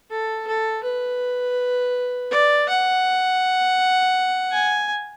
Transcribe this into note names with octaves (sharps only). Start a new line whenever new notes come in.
A4
A4
B4
D5
F#5
G#5